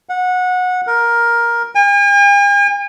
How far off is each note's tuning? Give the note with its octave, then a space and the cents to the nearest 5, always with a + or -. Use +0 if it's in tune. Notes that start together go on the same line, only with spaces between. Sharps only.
F#5 -20
A#4 +10
G#5 -45